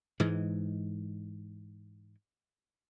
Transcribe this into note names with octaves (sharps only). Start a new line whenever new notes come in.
G#2 E3 G#3